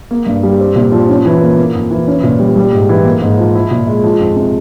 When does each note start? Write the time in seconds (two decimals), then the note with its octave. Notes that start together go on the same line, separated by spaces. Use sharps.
0.11 A#3
0.26 G2
0.43 G3
0.60 C4
0.76 A#2
0.92 F3
1.09 C#4
1.26 E3
1.42 A#3
1.59 A#3
1.75 F2
1.91 E3
2.07 C#4
2.23 A#2
2.40 G3
2.56 G3
2.73 G#2
2.89 E3
3.05 A#3
3.21 G#2
3.38 F3
3.55 E4
3.71 A#2
3.87 G#3
4.04 F3
4.21 F2
4.36 C3